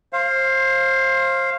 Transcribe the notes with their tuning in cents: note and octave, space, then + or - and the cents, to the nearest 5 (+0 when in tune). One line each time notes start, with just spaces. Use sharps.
C5 +30 F5 -5